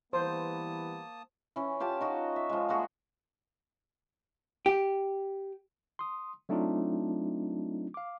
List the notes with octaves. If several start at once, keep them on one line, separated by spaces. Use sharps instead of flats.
E3 G3 A#3 B3 C5 A5 D#6
E3 C#4
F4 G4 G#5 A5
D#4 F#4 D#5
E5
F3 G#3
A3 A#3 F#4 G#4
G4
C6 D#6
F#3 A3 C4 D4 D#4 F4
F5 D6